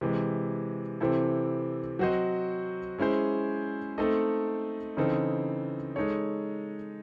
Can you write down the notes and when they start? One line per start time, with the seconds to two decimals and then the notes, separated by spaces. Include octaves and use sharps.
0.01 C3 E3 G#3
1.00 C3 E3 C4 E4 A4
1.99 F#3 C4 F#4 C5 D#5
2.98 G#3 C#4 E4 G#4 C5
3.98 A3 C4 D#4 A4 D#5
4.97 C#3 E3 C4 D#4 A4
5.96 G#3 D#4 A4 C#5